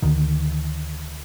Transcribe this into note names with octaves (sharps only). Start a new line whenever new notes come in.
D2 D3 D#3